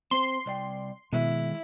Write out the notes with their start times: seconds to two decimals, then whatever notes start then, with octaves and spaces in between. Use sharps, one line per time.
0.11 C4 C5 C6
0.46 C2 D5 G5
1.13 B2 D#3 G#3 E4